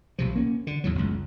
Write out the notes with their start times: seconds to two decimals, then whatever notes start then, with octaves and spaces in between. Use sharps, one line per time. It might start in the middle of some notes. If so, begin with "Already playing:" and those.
0.19 B1 C3 F3
0.35 A#3 C#4
0.67 D3
0.84 E2 A2 F#3
0.95 F#1 C#2